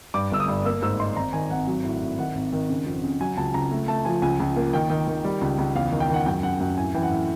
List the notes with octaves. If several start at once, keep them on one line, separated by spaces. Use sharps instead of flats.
G2 D6
G1 E6
D#6
G2
A#3 E6
G#2 E6
D#4 C6
G#1 A#5
D#3 G#5
G#1 F#5
F#3
A2
A2
D#3 F#5
G#1
D#3
C#3
F2
C#3
F#3 G#5
C#2 A5
C#2 A#5
A3
A3 A5
F3 G#5
C#2 G#5
C#2
A#3
D#3 G5
D#3
D#3
G3
C#2
C#2
E2 F5
D#3
G5
D#3 F#5
F#2 G5
F#2 F#5
F#2 F#5
A2 G#5
E3 G5
F#5
A2